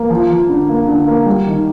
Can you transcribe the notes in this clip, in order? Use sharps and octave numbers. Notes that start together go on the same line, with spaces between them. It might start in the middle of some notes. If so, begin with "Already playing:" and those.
Already playing: A#3
F3
F3
D3
A#3
D3
A#3
G3
D#3